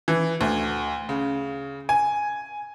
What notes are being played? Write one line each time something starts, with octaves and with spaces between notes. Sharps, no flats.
E3
D2
C#3
G#5